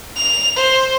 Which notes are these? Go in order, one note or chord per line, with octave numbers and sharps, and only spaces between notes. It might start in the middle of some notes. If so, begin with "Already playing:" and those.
F7
C5